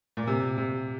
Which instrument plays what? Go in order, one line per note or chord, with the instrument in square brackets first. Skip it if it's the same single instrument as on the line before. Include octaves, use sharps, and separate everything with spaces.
[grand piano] A#2
C3
C3